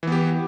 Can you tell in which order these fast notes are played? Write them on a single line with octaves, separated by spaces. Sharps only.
E3 B3 G4